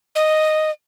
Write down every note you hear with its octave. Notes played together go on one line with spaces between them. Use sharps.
D#5